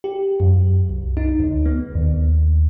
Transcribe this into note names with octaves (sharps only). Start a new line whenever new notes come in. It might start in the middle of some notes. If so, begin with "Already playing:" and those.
G4
F#2
C2
D#4
D2
B3
D#2